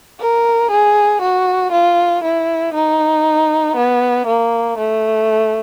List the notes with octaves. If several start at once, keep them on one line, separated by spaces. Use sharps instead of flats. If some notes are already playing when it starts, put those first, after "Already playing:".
A#4
G#4
F#4
F4
E4
D#4
B3
A#3
A3